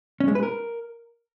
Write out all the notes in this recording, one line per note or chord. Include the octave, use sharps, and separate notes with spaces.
C#4
G#3
B4
A#4